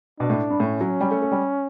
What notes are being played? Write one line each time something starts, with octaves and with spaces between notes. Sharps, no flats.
B2 D4
A2
G2
A2 C#4
F#3
G3
A3
A3
G3